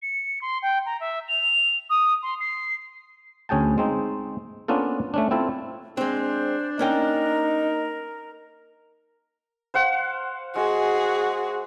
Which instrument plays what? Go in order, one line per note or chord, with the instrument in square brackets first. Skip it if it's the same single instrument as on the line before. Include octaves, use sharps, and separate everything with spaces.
[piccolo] C#7
C6
G5
A#5
E5
F7
D#6
C6
C7
[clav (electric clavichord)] D2 C#4 G#4 G5 A5
G#3 C4 D#4
A#3 B3 C#4 D4 F4 A4
A3 C#4 D4
C4 E4 F4 A4
[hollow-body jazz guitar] G#3 C4 [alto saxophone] D4 [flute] C5
[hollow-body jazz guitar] A#3 C#4 G5 [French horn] D#4 [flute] A#4
[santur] C5 F5 F#5
[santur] G#3 [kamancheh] F#4 G#4